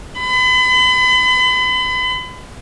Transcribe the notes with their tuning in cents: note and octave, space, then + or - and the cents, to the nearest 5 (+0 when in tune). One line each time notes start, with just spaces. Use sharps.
B5 +40